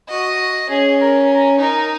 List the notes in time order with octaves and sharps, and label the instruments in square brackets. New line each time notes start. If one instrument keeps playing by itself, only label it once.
[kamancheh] F#4 [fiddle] D#5
[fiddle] C#4 [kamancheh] G#4
[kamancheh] A#4
A#4
[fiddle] D#4 [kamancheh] A#4